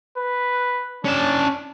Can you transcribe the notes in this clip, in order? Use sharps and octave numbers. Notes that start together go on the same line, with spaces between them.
B4
C#4 D4 A5